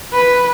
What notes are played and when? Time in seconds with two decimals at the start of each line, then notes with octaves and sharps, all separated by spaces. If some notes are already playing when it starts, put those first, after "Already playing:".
0.13 B4